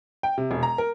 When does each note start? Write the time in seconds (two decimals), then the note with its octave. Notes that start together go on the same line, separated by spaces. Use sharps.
0.23 G5
0.38 C3
0.51 E1
0.63 A#5
0.78 A#4